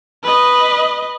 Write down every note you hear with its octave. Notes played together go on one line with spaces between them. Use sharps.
B4 D#5